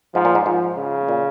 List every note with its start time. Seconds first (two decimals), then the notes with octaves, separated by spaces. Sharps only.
0.14 G#2 F3
0.25 A#2
0.35 G#2
0.46 G#2 F3
0.77 C#3
1.09 A#2